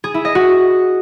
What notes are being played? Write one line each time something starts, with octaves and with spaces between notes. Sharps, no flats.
G#4
E4
D#5
F#4